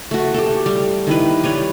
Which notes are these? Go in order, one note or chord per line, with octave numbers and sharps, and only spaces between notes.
A3 F#4
G4 A4
G3
D#3 E4 B4
G3 B4 C#5